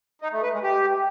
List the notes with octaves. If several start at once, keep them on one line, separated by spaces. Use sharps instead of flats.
D#4
A3
B4
G#3
G4